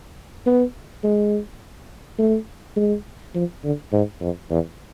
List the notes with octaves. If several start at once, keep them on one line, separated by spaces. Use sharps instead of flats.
B3
G#3
A3
G#3
F3
D3
G#2
F2
E2